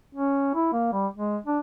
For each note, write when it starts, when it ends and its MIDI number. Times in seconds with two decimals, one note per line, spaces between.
0.15 0.51 61
0.55 0.69 64
0.73 0.90 58
0.93 1.08 55
1.16 1.37 56
1.47 1.59 62